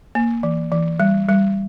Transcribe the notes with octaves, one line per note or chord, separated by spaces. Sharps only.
A#3
E3
E3
G3
G3